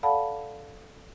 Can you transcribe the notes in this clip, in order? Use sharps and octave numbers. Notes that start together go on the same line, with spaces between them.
A4 D5 F5 F#5 A5 B5